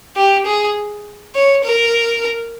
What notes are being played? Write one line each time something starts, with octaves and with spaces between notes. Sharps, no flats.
G4
G#4
C#5
A#4